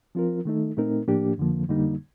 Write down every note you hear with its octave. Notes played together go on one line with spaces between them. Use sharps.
F3 C4 F4 A#4
D#3 A3 D#4 A4
A#2 A3 C4 D#4 A#4
A2 F3 A#3 D4 G4
F2 D3 F3 A#3
F2 D3 G3 A#3 D#4